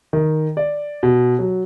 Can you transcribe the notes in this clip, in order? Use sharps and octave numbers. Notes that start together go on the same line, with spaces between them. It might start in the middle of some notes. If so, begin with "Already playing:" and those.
D#3
D5
B2
F#3